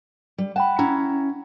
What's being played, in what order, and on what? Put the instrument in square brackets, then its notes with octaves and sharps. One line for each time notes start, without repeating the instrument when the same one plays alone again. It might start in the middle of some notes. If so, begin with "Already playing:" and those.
[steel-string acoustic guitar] G3
[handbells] F#5 G5 B5 [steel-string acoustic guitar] A5
[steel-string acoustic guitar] C#4 E4 [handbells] A#5